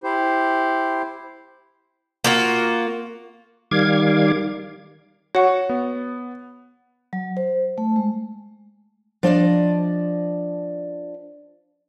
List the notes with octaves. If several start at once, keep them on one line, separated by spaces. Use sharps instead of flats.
E4 G4 C5
A#3 F4 F#4
D#3 G3 F5 D6 G#6
F#4 C#5 F#5 C#6
B3
F#3
C5
A3
G#3
F3 D4 D5 D#5